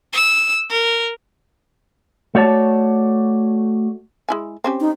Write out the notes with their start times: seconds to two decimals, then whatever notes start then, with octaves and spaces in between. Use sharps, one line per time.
0.13 E6
0.70 A#4
2.35 A3 F#4 C#5 D5 A5
4.29 G#3 E4 G#5
4.64 C4 C#4 G4
4.80 D#4